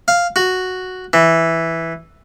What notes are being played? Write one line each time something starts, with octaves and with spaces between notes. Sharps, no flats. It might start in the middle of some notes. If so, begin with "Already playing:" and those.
F5
F#4
E3